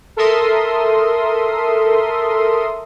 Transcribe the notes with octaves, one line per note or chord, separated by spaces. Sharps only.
A4 A#4 E5 C6 D#6